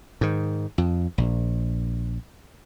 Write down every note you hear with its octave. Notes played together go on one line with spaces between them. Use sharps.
G#2 D#3
F2
A#1